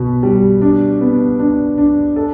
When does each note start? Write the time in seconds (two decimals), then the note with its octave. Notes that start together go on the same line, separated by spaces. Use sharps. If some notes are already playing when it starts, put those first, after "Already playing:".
Already playing: B2 B3
0.23 G3
0.61 D4
1.01 B3
1.39 D4
1.78 D4
2.16 A4